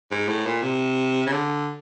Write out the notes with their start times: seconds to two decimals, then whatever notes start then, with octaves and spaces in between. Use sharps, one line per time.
0.11 G#2
0.28 A2
0.46 A#2
0.62 C3
1.26 C#3
1.32 D3